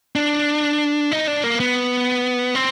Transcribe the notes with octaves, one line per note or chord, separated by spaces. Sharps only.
D4
D#4
D4
A#3
B3
C4